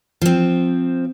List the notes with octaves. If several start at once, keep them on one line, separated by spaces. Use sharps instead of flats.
F3 C4